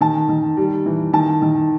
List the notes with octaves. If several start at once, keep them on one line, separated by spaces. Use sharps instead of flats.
D#3 A5
D#3
G3
E3
D#3 A5
D#3